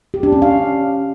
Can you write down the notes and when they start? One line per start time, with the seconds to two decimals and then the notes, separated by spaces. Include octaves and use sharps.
0.14 G4
0.23 D4
0.33 C#4
0.42 F5